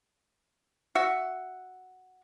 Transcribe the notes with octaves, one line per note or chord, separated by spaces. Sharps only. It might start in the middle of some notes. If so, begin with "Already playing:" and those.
F#4 E5 F#5